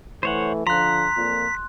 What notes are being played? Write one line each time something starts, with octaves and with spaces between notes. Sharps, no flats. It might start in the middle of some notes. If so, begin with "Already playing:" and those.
E3 A3 C5 C#5 F#5
D3 F3 A#5 C6 F#6 B6
F2 A#2